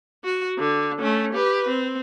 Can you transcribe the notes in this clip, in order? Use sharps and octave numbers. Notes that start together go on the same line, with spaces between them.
F#4
D3
A3 C#4
G4 B4
C4